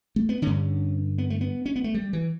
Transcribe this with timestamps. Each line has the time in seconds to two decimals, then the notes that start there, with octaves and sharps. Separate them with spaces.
0.16 A3
0.29 B3
0.42 G2 D3 C#4
1.18 B3
1.30 A3
1.41 B3
1.66 C#4
1.76 B3
1.84 A3
1.94 G3
2.13 E3